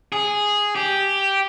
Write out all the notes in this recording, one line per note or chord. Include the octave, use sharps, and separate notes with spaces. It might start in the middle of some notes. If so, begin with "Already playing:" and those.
G#4
G4